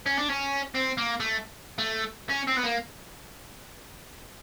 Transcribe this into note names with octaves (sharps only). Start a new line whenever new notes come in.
C#4
D4
C#4
C4
A#3
A3
A3
C#4
C4
B3
A#3